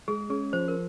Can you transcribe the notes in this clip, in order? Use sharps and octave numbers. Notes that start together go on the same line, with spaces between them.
G#3 G#4
C#4 G#4
F3 C5
A#4